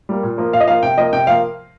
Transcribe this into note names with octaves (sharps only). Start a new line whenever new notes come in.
G3 A#3
A#2
F3 A#3
A#2 F5
D#5
F3 A#3 F5
C3 G5
F3 A#3 D#5
C3 G5
F3 A#3 F5